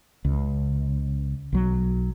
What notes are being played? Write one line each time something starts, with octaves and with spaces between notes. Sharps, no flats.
C#2
B1 F#3